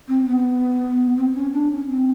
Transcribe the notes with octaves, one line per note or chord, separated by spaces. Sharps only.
C4
B3
C4
C#4
D4
C#4
C4